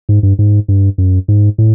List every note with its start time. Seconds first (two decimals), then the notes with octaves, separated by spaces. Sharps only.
0.09 G#2
0.23 G2
0.39 G#2
0.68 G2
0.98 F#2
1.28 G#2
1.58 A2